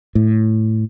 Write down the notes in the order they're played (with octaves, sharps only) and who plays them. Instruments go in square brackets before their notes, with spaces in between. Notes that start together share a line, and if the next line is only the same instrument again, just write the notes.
[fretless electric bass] A2